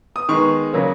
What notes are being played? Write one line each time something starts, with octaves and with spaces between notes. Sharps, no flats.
D#6
D#3 G#3 B3 C#6
C#3 F#3 A#3